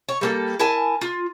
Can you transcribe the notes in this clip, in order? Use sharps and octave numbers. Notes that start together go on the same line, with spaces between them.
C#5
G3 A#3 A4
E4 A#4 G#5 A5
F4